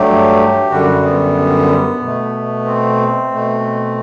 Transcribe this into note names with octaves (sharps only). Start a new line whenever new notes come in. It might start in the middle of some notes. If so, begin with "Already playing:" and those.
Already playing: G2 F#3 A3 G4
F#2 D3 G3 F#4
B3
B2 A3
C4
B2 A3